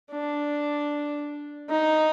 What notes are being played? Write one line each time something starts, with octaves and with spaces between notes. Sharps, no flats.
D4
D#4